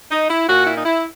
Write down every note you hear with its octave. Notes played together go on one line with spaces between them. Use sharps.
D#4
E4
A#2 F#4
E4
D#4
E4